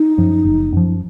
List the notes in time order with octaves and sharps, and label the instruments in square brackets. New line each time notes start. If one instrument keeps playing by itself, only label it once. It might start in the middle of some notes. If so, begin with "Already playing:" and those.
Already playing: [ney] D#4
[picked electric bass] F#2 F3
F#1
F#2 F3